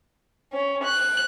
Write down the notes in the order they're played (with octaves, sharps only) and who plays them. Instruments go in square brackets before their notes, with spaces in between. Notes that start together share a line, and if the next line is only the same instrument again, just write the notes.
[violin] C#4
F#6